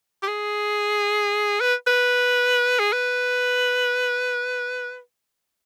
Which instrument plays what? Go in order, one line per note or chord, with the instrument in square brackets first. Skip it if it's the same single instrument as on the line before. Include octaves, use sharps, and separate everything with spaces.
[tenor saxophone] G4
G#4
B4
B4
G#4
B4